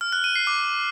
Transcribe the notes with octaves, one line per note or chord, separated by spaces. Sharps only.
F6
F#6
D#7
C7
D6